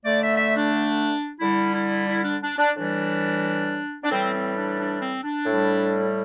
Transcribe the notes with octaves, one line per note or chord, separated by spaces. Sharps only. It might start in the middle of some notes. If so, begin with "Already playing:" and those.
D3 A3 D5
E5
E5
D4
D3 G3 E4
E4
E4
D4
D4
D4
A2 E3 G3 D4
D4
A2 E3 G3 C4
C4
D4
D4
C4
D4
A2 G3